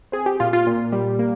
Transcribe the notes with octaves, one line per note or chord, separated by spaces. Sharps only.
C4 G#4
G4
A#2 F4
F4
A#2
G3
A#3